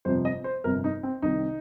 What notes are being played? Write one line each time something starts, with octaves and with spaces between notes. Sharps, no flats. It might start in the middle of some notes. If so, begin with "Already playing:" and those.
G1 F2 C3 F3 C5
D#5
C5
G1 F2 C3 F3 A#4
D#4
C4
C2 C3 D#3 D#4